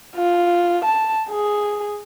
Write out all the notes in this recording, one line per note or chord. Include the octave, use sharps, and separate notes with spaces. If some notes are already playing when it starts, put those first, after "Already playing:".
F4
A5
G#4